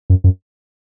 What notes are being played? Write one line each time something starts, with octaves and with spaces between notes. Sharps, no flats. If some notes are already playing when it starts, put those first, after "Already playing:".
F#2
F#2